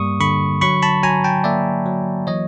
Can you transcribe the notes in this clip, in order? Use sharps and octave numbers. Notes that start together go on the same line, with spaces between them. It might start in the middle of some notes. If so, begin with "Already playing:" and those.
Already playing: G2 G3 A#3 C#6 D#6
D3 B5 C#6
F#3 B5 C#6
A5 B5
F#3 G#5 A#5
G5 A5
A#3 D5 E5
F#3
E3 C#5 D#5